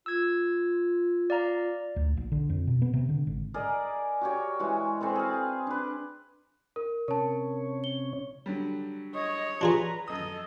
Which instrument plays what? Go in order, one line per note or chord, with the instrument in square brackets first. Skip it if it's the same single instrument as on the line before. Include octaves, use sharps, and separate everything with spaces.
[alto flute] F4 [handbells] E6 G#6
[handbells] D5 F5 A#5
[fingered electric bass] D2
A#1
D3
F2
B2
B3
C3
D3
G#1
[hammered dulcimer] G#4 A#4 D5 D#5
F#4 G4 C#5
E3 G#3 F#4
C4 G#4 A4 B4
G#4 F5
D4 B4
[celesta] A#4
[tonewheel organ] C3 C#4 C#5 [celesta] A#4 A5
[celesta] G7
[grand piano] D3 F#3 G3
[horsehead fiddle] C#5 [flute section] D#5 D#6
[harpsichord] D4 F4 G#4 [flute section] B4 A#5
[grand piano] F#2 D#6 [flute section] A4 [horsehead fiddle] D#5